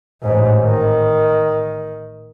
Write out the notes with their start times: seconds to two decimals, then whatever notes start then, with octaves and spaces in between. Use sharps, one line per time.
0.22 A1 G#2
0.65 D#3